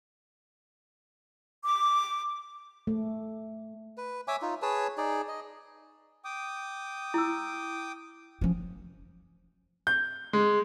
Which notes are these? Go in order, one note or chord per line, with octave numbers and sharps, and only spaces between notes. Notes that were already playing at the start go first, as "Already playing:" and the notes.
D6
A3
B4
C#5 E5 G#5 D6
D#4 F4
G#4 B4 C#5 A5
D#4 G#4 D5
D#5
G5 D6 D#6
E4 E6
F3 C#4
G6
G#3